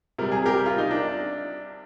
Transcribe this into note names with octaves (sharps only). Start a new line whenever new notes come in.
C3 G3 A#4
G#4
G4 A#4
F4
D#4
D4